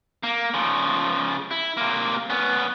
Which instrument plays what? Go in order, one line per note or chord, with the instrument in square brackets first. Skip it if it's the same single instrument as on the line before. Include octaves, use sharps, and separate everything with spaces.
[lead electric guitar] A#3
C#3 F3
E4
C3 A#3
B3 C#4